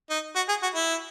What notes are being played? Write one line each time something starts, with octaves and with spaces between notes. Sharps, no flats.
D#4
F#4
G#4
F#4
E4